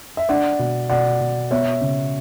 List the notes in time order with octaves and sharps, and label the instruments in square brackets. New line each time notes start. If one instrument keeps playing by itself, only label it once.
[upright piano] E5
[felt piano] D4 [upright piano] D5 F#5
[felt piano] B2
[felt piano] B2 [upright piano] D5 F#5
[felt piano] B2
[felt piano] B3 [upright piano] C#5 E5
[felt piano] C#3